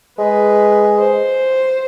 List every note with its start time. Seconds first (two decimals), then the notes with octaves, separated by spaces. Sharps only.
0.18 G#3 B4
0.99 C5